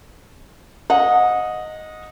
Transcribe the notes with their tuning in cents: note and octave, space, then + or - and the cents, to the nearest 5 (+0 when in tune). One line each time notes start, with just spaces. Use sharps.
D#5 +0 F#5 -30